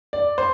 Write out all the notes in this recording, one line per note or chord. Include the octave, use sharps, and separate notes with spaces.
D5
C5